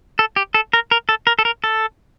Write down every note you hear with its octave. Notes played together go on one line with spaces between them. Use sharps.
A4
G4
A4
A#4
A#4
A4
A#4
A4
A#4
A4